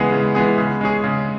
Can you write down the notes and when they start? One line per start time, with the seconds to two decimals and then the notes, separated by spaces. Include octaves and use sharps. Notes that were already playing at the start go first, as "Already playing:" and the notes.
Already playing: C#3 E3 G#3 B3 G#4
0.12 C#3
0.35 E3 G#3 B3 G#4
0.58 C#3
0.81 G#3 C#4 G#4
1.04 C#3